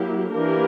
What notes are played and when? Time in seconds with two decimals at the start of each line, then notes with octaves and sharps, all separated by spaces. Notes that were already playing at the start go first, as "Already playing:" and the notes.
Already playing: F#3 A#3 E4 G4
0.33 E3 A#3 D4 G4 A#4